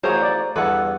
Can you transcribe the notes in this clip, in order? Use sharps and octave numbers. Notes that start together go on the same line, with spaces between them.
A1 F4 F#4 G#4 A#4 C5 C#5 A#5
D5
E2 G2 B3 A4 B4 F#5